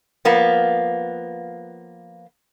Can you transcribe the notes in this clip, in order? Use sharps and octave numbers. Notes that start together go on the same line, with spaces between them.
F3 A#3 B3